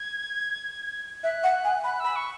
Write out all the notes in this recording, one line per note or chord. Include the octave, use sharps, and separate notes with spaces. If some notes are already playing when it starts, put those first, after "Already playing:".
Already playing: G#6
E5 F#6
F#5
G#5
B5 F#6
B5 E6
C#6